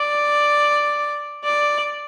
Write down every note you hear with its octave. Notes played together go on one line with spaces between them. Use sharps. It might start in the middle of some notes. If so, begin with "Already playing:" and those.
Already playing: D5
D5